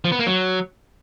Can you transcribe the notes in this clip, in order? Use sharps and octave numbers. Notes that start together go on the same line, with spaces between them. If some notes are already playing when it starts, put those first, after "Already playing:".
F3
B3
A#3
F#3